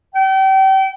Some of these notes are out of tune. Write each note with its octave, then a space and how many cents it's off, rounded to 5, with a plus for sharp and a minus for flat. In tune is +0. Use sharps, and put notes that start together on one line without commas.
G5 -35